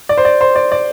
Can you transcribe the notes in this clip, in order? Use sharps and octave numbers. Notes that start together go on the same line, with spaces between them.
D5
C5
D5
C5
D5
D5